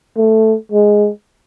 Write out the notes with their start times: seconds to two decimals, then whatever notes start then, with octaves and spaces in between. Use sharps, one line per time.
0.17 A3
0.72 G#3